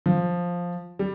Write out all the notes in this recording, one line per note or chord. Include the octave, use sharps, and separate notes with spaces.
F3
G3